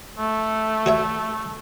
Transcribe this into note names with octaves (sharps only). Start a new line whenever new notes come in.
A3
F#4 C#5 E5